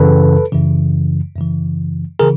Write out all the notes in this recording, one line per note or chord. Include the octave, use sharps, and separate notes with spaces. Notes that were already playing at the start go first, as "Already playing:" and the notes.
Already playing: F#2 C#3 E3 A4 B4
F#2 C#3 E3
F#2 C#3 E3
C#3 E3 G#4 A#4